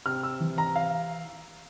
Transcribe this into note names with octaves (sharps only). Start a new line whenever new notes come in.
C3 F6
E6
E3
A#5
F5